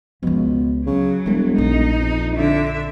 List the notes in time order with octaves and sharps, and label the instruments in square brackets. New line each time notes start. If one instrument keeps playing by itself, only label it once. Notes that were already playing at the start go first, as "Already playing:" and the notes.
[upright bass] C#2 F3 [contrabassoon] B2
[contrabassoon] C#3 [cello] F#3
[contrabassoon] E1 [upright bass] G3 G#3
[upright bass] A#1 [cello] D#4
[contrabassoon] F2
[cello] D3 E5